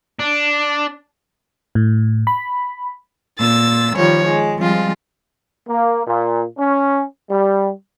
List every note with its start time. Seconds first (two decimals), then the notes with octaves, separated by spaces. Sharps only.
0.20 D4
1.75 A2
2.27 B5
3.38 A#2 E6 A6
3.96 D#3 F3 G3 C#5
4.24 G#3
4.58 F3 G3 G#3 C4 F4
5.68 A#3
6.07 A#2
6.57 C#4
7.30 G3